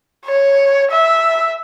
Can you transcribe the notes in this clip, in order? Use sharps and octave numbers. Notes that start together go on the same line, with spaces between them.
C#5
E5